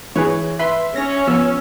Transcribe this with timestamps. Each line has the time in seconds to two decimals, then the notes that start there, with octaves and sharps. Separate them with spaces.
0.16 E3 G#4 B4 C#5
0.59 B4 E5 B5 C6
0.96 C#4 A#6
1.27 F3 B3 E6